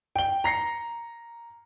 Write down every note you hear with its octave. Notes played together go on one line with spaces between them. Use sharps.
G5 G7
A#5 A#6 C7 C#7